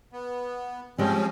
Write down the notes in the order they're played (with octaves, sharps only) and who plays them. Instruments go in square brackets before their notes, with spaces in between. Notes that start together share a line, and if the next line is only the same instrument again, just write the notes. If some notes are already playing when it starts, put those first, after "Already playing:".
[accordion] B3
[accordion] F3 C4 C#4 [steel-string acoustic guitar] G3 G#3